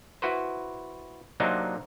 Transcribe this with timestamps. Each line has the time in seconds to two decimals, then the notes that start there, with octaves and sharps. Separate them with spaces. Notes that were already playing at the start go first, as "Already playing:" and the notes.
0.22 E4 F#4 B4 C5
1.40 C3 F#3 A#3 C4 D4 D#4